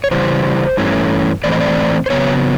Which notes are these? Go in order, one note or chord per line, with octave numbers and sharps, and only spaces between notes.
C#5
C#3 E3 G3 C5
G2 E3 A3 C#4
A2 E3 A3 C4 D5
D#5
D5
C5
C#3 F#3 B3 C#5